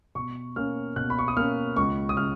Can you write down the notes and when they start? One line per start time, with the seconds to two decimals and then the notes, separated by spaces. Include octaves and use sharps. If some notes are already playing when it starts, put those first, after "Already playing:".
0.15 B2 C#6
0.56 A#3 C#4 F6
0.96 B2 F#6
1.10 B5
1.19 C#6
1.28 D#6
1.37 A#3 C#4 F6
1.76 C#2 C#6
2.09 D#6
2.17 C#3 G#3 F6